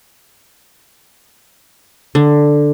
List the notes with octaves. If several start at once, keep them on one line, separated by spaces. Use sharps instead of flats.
D3